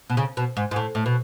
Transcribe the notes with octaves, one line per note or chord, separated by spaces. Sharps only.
B2
C#3
B2
G#2
G#2
A2
A2
B2